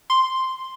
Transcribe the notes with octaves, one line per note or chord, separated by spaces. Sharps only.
C6